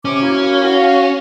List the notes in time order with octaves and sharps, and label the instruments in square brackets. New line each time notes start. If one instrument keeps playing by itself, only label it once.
[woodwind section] C3 D6 [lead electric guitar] C#4
[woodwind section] A#3 E4 F#4
F#4 F5